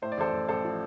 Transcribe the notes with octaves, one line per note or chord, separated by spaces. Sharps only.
A2 C5
D5
A1 A4 C5
A1
A1 A4 C5
F3